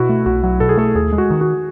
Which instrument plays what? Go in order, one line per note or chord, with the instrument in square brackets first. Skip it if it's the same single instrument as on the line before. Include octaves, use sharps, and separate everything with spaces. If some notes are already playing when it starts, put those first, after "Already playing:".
Already playing: [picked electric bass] B2 [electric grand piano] E4 F#4
[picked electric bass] A3
[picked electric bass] B1 [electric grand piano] F#4
[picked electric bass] F#3
[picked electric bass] B2 [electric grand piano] A4
[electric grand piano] G#4
[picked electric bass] A3 [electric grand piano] A4
[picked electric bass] D#2 [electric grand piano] G#4
[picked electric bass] G#3
[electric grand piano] F#4
[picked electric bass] D#3
[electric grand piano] F#4